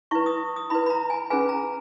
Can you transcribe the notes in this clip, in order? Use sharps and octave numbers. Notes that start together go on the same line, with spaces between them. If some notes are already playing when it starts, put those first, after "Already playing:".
E4 B4 C#6
D#6
D#6
E4 B4 B5
B5
A#5
G#5
C#4 G#4 B4 G#5
A#5